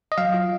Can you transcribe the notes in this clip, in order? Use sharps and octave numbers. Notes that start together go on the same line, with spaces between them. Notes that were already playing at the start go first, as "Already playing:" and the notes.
D#5
F#3 F5
F4